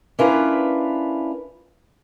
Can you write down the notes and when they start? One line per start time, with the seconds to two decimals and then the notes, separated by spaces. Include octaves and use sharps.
0.19 C#4 D4 E4 F4 A#4 B4